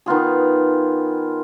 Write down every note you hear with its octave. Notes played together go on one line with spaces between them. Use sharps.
D#3 B3 F4 G#4